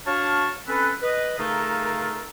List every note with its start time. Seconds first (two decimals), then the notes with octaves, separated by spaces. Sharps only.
0.06 D4 F#4 C#5 F5 A5 F6
0.67 C4 C#4 A4 B4
1.01 B4 D#5
1.39 C#3 A3 D#4 F4 A4 A#4